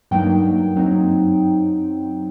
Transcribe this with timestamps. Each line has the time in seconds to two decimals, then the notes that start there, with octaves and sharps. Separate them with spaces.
0.11 G2 F#3 A#3 D#4 G5
0.76 F#2 F#3 C4 D#4